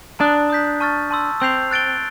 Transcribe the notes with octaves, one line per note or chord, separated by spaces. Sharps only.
D4 A#5 D#6 F#6
D#6 G6 B6
A5 C#6 F6 A6
A5 C6 E6
C4 E6 G6 C7 F7
F#6 A6 D7 G7